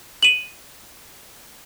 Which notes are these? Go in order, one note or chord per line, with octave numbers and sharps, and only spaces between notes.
D#7 E7 F#7